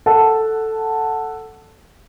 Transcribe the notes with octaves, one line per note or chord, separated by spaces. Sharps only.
A4 F#5 A5